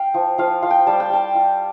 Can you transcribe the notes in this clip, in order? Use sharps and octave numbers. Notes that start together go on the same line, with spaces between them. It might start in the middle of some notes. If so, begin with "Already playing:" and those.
Already playing: F5 G5
F3
F3 F5
F4 F5
G5
G3 A5
G5
G3 A5
F4